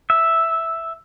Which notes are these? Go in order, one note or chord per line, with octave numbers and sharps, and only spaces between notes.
E5